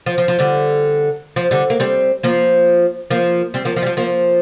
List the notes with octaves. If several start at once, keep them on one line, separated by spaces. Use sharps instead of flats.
F3
F3
F3
D3 G3
F3
D3 G3
A#3
G3 C4
F3 A#3
F3 A#3
G3 C4
F3 A#3
F3
G3
F3
F3 A#3